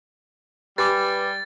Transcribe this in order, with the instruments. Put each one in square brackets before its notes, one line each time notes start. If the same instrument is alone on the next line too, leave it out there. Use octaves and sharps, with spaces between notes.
[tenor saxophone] G3 [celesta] G4 G#5 D6 [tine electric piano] B4 [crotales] A6